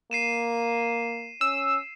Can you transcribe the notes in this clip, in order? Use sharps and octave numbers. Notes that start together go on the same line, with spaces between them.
A#3 C7 D#7 E7
C#4 E6